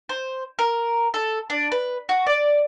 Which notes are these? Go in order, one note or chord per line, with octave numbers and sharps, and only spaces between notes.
C5
A#4
A4
D4
B4
F#4
D5